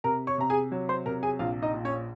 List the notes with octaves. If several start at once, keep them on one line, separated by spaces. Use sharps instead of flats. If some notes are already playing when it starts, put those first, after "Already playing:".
C3 A#4 A#5
C#5 C#6
C3 A#5
G#4 G#5
F#3
C5 C6
C3 A#4 A#5
G#4 G#5
A#1 F4 F5
D#4 D#5
A#2
C#4 C#5